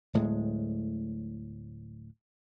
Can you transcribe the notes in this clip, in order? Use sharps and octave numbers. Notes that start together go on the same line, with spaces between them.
D1 A2 G#3